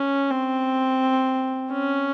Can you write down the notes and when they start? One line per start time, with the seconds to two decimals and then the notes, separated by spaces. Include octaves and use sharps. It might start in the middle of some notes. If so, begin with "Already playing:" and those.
Already playing: C#4
0.30 C4
1.72 C#4